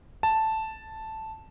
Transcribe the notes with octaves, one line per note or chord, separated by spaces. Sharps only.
A5